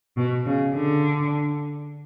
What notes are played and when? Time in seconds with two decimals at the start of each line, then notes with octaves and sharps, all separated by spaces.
0.17 B2
0.46 C#3
0.75 D3